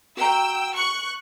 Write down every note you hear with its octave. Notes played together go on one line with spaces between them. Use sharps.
F#4 G5 A#5 E6
C#6 F#6